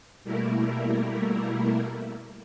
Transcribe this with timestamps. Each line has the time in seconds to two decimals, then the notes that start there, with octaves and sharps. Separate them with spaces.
0.24 B2 G3 A3 A#3 E4 A#4